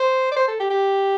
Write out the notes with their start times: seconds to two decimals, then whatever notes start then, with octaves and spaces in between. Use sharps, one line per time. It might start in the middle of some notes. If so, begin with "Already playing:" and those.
Already playing: C5
0.32 D5
0.37 C5
0.48 A4
0.60 G4
0.70 G4